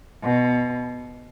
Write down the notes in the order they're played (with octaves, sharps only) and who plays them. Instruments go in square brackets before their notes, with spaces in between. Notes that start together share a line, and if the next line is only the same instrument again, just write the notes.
[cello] B2